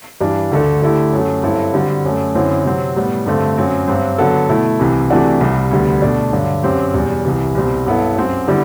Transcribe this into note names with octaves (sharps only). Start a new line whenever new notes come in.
G2 E3 G3 D4
D2 D3 A3 D4 A4
D3 A3 E4 G4
F#2 F#3 A3
G2 F#3 C4 E4 A4
D3 G3 C4 F#4
F#2 F#3 A3
F#2 D3 F#3 C4 E4
C3 F#3 C4
A2 G3 B3
G2 D3 A3 C4
F#2 F#3 C4
G2 F#3 C4
D3 F#3 B3 F#4 A4
B2 A3 E4
C2 C3 E3
C3 E3 A3 D4 F#4
C2 C3 G3
D2 D3 G3 B3
B2 A3 D4
G2 D3 F#3
F#2 F#3 C4 G4
E2 B2 G3
C2 C3 E3
C2 B2 G3 C4
G2 F#3 B3 E4 A4
F#2 F#3 C4 F#4
D3 G3 B3 E4